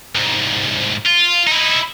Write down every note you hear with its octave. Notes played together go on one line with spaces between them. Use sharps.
C2 G#2
F4
D#4 E4